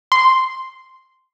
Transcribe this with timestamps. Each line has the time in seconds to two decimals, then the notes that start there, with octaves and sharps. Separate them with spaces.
0.12 C6